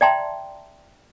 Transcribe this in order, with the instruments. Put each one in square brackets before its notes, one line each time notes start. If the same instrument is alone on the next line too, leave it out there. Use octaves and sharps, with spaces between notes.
[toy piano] D5 E5 G5 A5 A#5 C6